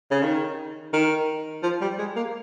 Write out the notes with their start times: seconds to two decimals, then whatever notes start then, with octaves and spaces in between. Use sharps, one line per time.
0.11 C#3
0.23 D#3
0.93 D#3
1.63 F3
1.81 G3
1.99 G#3
2.16 A#3